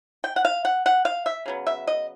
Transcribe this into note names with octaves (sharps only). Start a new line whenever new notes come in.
G5
F#5
F5
F#5
F#5
F5
E5
C#3 F#3 B3
E5
D#5